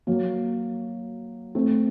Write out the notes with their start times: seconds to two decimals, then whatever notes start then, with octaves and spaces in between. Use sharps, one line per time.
0.07 F#3 A#3
1.55 A3 C4